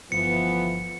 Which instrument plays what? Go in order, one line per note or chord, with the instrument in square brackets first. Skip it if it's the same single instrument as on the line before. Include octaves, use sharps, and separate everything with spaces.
[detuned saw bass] G1 [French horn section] E3 A3 B3 [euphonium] F3 [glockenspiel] C#7